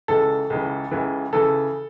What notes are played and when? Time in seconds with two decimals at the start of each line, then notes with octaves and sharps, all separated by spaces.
0.08 C#2 C#3 E3 A4
0.50 C#2 C#3 E3
0.91 C#2 C#3 E3
1.33 C#3 E3 A4